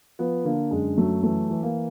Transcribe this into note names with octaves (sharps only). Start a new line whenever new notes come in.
F3 B3
D3 A#3
F#2 G#3
F#3 A3
E3 A3
E3
A#3